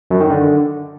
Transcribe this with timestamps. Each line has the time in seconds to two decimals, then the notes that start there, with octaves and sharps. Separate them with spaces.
0.11 F#2
0.20 D#3
0.30 D3